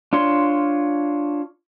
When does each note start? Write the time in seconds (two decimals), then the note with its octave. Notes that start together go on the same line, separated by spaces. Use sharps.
0.13 D4 F4 C#5 C6